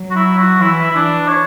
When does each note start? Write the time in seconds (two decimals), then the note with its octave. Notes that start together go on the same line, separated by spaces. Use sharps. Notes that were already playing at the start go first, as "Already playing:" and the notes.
Already playing: F#3
0.11 F#4
0.16 E4
0.37 F#4
0.60 E3 E4
0.91 E4
0.95 E3 D4
1.29 C#5